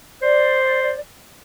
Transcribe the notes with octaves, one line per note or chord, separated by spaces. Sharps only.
C5 D5